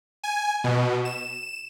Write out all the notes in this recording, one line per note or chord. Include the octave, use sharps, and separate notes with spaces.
G#5
B2
E7